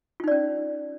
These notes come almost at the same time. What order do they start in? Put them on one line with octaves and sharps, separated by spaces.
F4 D#4 D5 C#4